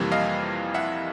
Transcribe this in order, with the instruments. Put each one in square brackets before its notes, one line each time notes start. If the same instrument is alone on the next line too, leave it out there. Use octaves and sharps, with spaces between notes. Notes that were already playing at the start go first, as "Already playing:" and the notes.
Already playing: [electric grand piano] F2 C3 E3 G3 A#3
D#5 F5
E5 F#5